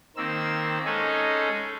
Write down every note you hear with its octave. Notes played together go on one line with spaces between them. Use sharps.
D#3 A#3 C4 E6
G#3 C#4 D#4 G#4 A4